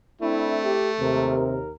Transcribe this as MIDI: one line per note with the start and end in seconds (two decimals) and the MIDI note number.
0.21 1.39 57
0.21 0.74 60
0.21 0.74 62
0.21 0.74 64
0.64 0.90 67
1.00 1.73 39
1.00 1.57 48
1.00 1.73 70